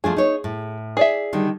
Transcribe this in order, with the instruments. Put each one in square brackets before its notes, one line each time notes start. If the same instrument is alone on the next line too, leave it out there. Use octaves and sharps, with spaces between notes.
[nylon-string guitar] F3 A3 D4 [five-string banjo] G#4
[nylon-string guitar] D#4 C#5
A2
[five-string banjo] G#4 D5 E5
[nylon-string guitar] D3 D#3 G3